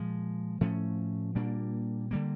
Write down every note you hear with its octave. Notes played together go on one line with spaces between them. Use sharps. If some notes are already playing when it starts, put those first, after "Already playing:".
Already playing: A#2 F3 G#3
A2 F3 A3 C#4
A#2 G3 A#3 D4
D3 G3 A#3